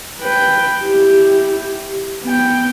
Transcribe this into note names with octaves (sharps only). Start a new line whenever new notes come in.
B4 G5
E4 G4
B3 G5